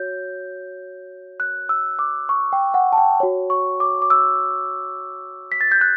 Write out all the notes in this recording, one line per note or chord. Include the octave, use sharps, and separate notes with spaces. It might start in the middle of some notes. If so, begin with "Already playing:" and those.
Already playing: F#4 C#5 G6
F#6
E6
D6
C#6
G5
F#5
A5
G5
F#4 C#5
C#6
D6
D6
E6
B6
A6
G6
F#6